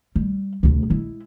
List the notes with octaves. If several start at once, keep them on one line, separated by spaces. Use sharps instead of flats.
G3
D2 C3
G#3 E4